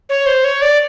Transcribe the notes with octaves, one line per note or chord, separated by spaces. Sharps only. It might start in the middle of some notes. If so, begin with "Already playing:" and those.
C#5
C5
C#5
D5